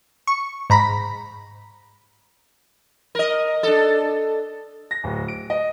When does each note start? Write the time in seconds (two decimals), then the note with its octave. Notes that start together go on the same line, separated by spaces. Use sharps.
0.27 C#6
0.70 G#2 A#5 B5
3.15 A#4 D#5
3.63 D4 A4
4.91 A#6
5.04 D1
5.28 D7
5.50 D#5